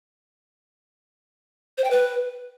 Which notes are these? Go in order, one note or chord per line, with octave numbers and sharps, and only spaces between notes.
C5
G5
B4